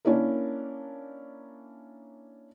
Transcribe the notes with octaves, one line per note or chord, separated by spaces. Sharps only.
A#3 C#4 D4 E4 A#4